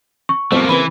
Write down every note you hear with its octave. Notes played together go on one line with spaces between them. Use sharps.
C#6
G2 B2 F3 A3 A#3 C4
C#3 E3 A#3 B4 B5